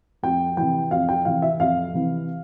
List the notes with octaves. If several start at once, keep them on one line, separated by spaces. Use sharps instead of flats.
F2 G5
C3 E3 G5
F2 F5
G5
C3 E3 F5
E5
F2 F5
C3 E3